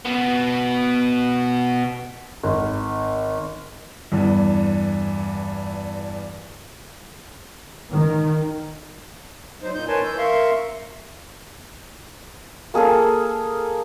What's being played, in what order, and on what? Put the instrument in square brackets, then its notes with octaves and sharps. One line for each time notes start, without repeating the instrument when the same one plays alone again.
[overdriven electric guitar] B2 B3
[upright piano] G#1
[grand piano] E2 G2
[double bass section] D#3
[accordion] F#3 D#4 C5
A#2 D#4 G6
A#4 B4 C#5 G#5 A5 C6
E3 E6 G6
A#4 E5 F5 C6 C#6
[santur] A#3 G#4 A4 F5